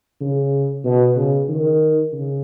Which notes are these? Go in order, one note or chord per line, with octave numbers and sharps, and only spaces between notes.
C#3
B2
C#3
D#3
C#3